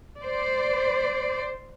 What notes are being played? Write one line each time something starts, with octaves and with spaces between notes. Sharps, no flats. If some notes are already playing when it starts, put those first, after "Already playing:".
C5 D5